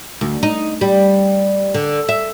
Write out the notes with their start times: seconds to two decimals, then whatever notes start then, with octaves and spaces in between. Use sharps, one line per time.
0.21 D2
0.43 D#4
0.81 G3
1.74 D3
2.09 E5